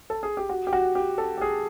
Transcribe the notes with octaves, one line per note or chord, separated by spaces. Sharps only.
A4
G#4
G4
F#4
G4
F#4
G4
A4
G4
G#4